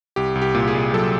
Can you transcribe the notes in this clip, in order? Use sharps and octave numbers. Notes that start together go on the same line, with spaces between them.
C2 G4
C2
G4
A#2
G#4
C2
F#3 A4